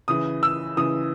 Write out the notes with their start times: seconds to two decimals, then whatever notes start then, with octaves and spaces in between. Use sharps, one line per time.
0.08 C#3 E3 D#6
0.43 E6
0.77 C#3 E3 D#6